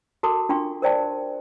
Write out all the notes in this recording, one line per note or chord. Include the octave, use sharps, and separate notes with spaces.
F#4 A4 A#4 A5 D6
D4 F4 G5 C6 C#6
A#4 C5 D5 G5 A5